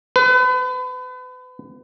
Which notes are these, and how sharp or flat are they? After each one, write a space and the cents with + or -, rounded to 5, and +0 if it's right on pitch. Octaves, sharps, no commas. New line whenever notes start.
B4 +35